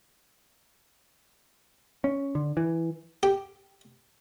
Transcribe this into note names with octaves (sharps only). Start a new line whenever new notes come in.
C#4
D3
E3
G4